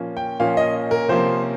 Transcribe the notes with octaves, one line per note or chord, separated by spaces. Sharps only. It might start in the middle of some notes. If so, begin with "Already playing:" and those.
Already playing: A#2 F3 A#3 C#4
G5
A#2 F3 A#3 C#4 F5
D#5
A#4
C3 F3 A#3 C#4 C5